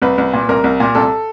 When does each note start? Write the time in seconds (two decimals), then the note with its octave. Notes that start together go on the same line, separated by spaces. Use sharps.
0.02 C2 B4
0.18 C2
0.33 A#2
0.49 C2 A#4
0.64 C2
0.80 A#2
0.95 C2 A4